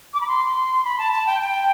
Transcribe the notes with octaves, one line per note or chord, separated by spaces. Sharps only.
D6
B5
C6
B5
A5
A5
G5
G5